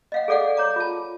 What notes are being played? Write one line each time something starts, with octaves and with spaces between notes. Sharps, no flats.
D#5 F5 F#5
G#4 A4 D5 F5 F#5
C#5 A#5 D6
F4 A5